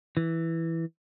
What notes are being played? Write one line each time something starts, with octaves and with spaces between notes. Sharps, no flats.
E3